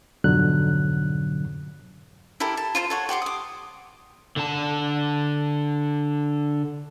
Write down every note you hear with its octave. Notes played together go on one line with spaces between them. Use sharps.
F2 G#2 B2 D3 F#3 F#6
E4 G4 A4 A#4
A5
F4 C5 A5 C6
A4 C#5 F#5
G4 F#5 C6 D6
D6 D#6
D3 A5